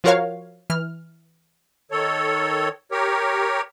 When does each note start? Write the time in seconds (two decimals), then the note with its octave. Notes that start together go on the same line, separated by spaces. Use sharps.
0.04 F3 F4 F#4 A#4 C#5 F5
0.70 E3 F6
1.91 D#3 A4 C#5
2.92 G4 A#4 C#5